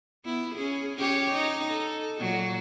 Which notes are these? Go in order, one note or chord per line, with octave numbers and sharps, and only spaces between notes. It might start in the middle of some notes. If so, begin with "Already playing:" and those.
B3 E4
C#4 G#4
C#4 G4 C#5
D#4
A4
A#2 F#3 F#4